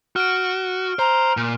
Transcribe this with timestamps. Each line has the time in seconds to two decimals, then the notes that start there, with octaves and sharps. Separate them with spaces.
0.16 F#4 F6 D7
0.99 C5 A#5
1.37 A#2